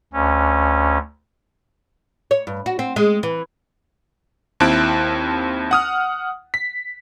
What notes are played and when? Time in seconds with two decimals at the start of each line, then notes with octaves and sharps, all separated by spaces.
0.13 D2 C#4
2.31 C#5
2.47 G2
2.66 F#4
2.79 C4
2.96 G#3
3.23 E3
4.60 D#2 C4 E4 A5 F#6 D7
5.71 F#5 D#6 F6
6.54 B6